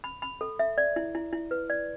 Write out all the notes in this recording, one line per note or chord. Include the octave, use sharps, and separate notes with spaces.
B5
B5
A4
E5
D5
E4
E4
E4
B4
D5